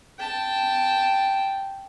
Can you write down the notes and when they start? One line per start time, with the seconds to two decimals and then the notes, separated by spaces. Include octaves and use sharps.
0.19 G5 A5